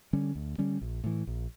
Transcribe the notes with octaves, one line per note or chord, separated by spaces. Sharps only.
D3 G3 C#4
D2
D3 G3 C#4
A#1
A2 E3
A#1